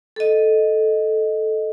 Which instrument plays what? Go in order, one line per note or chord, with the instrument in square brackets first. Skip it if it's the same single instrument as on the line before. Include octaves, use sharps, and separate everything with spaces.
[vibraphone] A4 D#5